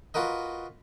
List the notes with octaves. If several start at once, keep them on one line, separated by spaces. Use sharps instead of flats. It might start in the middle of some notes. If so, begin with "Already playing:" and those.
F4 F#4 A#4 B4 D#5